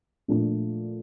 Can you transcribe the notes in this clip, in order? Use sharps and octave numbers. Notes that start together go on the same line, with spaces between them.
A#2 F3 A3 D4